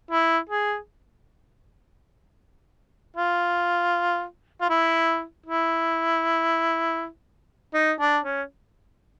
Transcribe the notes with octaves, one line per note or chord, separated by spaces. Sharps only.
E4
G#4
F4
F4
E4
E4
D#4
D4
C#4